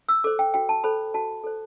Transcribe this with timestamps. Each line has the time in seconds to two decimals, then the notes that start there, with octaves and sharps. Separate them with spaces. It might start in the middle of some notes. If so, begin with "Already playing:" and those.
0.09 E6
0.24 A4 C5 D6
0.39 G5
0.54 F#4 G5
0.69 A5
0.84 A4 C5 B5
1.14 F#4 A5
1.44 A4 C5